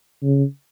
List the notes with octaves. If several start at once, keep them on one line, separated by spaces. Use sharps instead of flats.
C#3